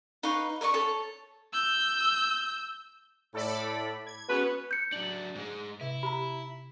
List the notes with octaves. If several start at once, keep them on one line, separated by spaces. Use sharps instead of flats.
D#4 B4 F5 C#6
A#4 D5 B5 C#6
A4 C#5
E6 G6
A2 A4 D5 B5
G#6
G#3 B3 C#4 F#4 B4
G6 C#7
F#3 D4 F#7
G#2 G#3
C3 E4
G4 A#5 B5